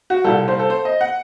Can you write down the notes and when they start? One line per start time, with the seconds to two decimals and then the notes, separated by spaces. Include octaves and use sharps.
0.10 F#4
0.24 C2 A#2 G3 A4
0.48 C5
0.59 A4
0.70 C5
0.85 D#5
1.01 F#5